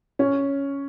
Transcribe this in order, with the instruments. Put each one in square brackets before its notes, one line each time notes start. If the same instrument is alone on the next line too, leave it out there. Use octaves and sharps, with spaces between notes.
[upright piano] C#4